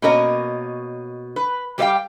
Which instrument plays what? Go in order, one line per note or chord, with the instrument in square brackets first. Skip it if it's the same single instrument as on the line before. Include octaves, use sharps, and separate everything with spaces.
[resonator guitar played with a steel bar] B2 A#3 C#4 A#4 C#5 D#5
B4
G3 G4 C5 D#5 F5 G5